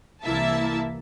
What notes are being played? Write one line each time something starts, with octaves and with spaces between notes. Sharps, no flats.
C2 E3 A#3 E4 E5 A5